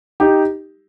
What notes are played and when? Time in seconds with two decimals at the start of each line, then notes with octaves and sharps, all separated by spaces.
0.20 D#4 G4